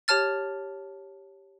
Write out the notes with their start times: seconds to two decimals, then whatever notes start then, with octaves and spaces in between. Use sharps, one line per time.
0.08 G4 C#5 A5 F6 A6